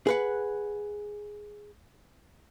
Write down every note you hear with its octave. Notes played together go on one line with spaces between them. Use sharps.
G#4 B4 F#5